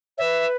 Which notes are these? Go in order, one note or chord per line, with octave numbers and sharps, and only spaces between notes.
B4 C#5 E5